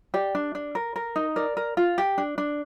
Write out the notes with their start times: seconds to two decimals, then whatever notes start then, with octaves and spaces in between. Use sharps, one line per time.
0.14 G4 D5
0.35 D4
0.55 D4
0.75 A#4
0.96 A#4
1.16 D#4
1.36 A#4 D5
1.57 A#4
1.77 F4
1.98 G4
2.18 D4
2.38 D4